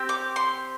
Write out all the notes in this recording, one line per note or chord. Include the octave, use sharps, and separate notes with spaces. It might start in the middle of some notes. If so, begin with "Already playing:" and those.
Already playing: C4 G4
D6
C6